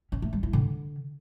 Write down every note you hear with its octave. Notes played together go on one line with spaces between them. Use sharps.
C#4
A3
G3
E4
D3